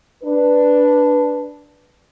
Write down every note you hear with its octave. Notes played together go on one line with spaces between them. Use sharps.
D4 B4